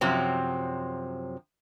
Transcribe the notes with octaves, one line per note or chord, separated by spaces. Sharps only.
F#2 C3 F3 F#3 C4